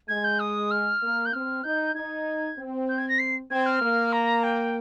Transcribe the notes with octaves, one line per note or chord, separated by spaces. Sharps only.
G#3 G#6
G6
D#6
F6
A#3
G6
C4 F6
D#4 G6
D#4 G#6
C4
G6
G#6
A#6
C7
C4 G#6
F6
A#3
A#5
G5